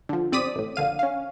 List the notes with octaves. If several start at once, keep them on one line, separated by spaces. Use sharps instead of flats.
D3 F3
G1 C4 D5 D#6 B6 D#7
A1 A2
A#1 D3 F5 D#7
C#4 F5